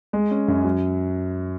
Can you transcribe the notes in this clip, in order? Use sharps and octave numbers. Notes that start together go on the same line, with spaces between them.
G#3
C#4
F#2
F#3